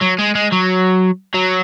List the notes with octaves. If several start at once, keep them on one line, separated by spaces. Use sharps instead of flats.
F#3
G#3
G#3
F#3
F#3